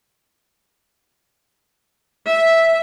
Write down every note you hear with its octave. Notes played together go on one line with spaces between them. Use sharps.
E5